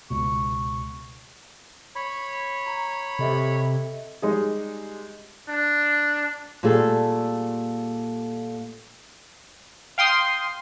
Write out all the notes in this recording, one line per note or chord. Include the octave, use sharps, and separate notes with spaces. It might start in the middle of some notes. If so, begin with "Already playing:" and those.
C#2 B2 C#6
C#5 B5
A#5
C3 A4 D#5 E5
G3 G#3 D#4 G#4
D4
A#2 G3 A3 G#4 A4
F5 G5 C6 D#6